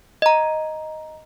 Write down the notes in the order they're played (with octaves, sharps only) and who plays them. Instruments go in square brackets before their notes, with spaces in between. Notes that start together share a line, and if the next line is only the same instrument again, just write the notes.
[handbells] D#5 A#5